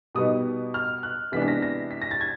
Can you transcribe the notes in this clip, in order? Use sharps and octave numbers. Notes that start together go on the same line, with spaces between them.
B2 G3 B3 D#4 D#6
F6
F#6
C3 E3 G#3 B3 D4 B6
B6
A#6
A#6
B6
A#6
A6
G#6